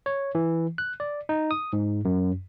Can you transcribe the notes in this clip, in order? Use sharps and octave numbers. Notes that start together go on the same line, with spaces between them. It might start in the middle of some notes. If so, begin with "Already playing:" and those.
C#5
E3
F#6
D5
D#4
D#6
G#2
F#2